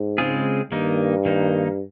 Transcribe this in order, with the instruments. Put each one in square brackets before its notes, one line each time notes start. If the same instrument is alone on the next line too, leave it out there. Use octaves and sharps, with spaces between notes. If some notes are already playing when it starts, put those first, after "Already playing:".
Already playing: [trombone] G#2
[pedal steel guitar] C#3 G#3 C4 F4 G#4
[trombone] G2 [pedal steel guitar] D#3 A#3 D#4
[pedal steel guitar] D#3 A#3 D#4